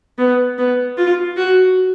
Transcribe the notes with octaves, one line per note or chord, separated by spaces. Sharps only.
B3
B3
F4
F#4